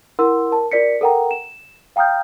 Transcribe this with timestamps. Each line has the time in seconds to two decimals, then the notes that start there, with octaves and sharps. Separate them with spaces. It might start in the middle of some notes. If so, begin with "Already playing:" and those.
0.19 E4 A#4 F#5 C6 E6
0.52 A#4 A5
0.72 F4 A#4 D5 B6 C#7
1.01 A4 A#4 F#5 G5 A#5
1.31 E7
1.96 F5 G5 A#5 D#6 F6 G6